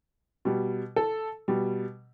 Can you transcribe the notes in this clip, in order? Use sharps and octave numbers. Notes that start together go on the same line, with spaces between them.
B2 G3
A4
B2 G3